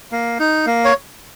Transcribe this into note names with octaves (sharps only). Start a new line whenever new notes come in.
A#3
D#4
A#3
C#5